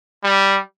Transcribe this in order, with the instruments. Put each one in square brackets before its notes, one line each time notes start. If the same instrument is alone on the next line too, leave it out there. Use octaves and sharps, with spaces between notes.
[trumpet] G3